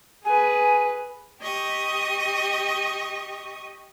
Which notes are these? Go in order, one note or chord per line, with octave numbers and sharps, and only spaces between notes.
G#4 B4 G#5
G4 D#5 C#6 D#6